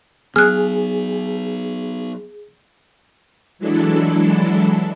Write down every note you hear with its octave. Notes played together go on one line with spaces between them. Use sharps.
F#3 B3 G#4 F6 F#6
E3 F#3 G#3 D4 E4 A4